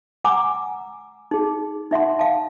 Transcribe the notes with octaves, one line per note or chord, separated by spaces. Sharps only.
F#5 G#5 A#5 D6 E6
D#4 G#4
D#4 E5 F#5 C6
F5 A5